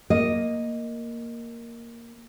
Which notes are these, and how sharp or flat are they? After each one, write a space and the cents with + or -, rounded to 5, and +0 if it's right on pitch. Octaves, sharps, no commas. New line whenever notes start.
A#3 +0 D#5 +0